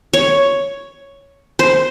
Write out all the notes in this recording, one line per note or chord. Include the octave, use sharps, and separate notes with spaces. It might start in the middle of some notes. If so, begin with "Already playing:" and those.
C#5
C5